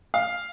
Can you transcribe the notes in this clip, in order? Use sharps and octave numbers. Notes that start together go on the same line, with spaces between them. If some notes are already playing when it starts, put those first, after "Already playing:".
F5